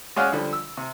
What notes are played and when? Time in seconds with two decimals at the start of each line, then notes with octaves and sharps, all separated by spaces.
0.16 G#3 C#4 C#5 D5 F5 F#5
0.32 D3 F3 G3
0.53 E6
0.77 C3